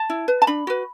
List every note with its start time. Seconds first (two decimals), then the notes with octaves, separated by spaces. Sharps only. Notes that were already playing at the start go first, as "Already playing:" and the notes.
Already playing: A5
0.10 E4
0.28 B4
0.42 A5
0.47 D4 B5
0.67 F#4 B4